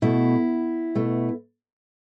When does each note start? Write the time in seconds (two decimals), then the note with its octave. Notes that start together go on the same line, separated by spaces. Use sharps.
0.02 B2 A3 E4
0.95 B2 A3